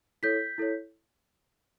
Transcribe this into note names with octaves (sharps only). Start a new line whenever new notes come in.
E4 A4 C#5 G6 B6
E4 A4 C#5